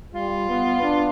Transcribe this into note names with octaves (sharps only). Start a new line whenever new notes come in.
G3 F4
B3
D4